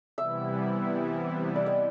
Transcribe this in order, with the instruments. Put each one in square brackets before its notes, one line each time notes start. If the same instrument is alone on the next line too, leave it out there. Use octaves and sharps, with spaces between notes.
[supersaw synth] C3 E3 G3 B3 E4 [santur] E5
[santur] D5
D#5